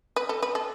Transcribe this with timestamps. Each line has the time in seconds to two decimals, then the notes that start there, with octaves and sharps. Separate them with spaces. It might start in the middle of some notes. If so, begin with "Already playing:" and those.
0.16 B4
0.29 A4
0.43 B4
0.55 A4